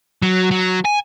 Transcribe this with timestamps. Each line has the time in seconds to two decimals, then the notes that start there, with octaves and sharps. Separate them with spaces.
0.23 F#3
0.51 F#3
0.85 G#5